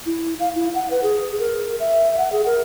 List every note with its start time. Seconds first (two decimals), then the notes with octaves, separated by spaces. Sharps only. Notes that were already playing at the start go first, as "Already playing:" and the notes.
0.06 E4
0.40 F5
0.56 E4
0.75 F#5
0.90 B4
1.03 G#4
1.39 A#4
1.80 E5
2.18 F#5
2.32 G#4
2.46 A#4